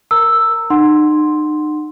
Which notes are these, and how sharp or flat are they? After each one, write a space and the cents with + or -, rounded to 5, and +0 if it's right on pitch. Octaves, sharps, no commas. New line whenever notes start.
A#4 +0 A#5 -30 E6 +0
D#4 -40 F#5 -5 C6 +0